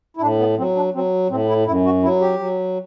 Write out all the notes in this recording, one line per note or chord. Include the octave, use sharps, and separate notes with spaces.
E4
A2 D4
B3
F#3 C4
D4
F#3 C4
A2 C4
E4
F#2 E4
F#4
F#3 E4
G4
F#3